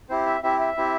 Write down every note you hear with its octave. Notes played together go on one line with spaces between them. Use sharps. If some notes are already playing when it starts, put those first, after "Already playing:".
C4 E4 G4 C5
E5
C4 E4 G4 E5
E5
C4 E4 G4